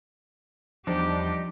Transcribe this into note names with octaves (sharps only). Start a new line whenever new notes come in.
E2 F3 G3 D4 D#4 G4 D6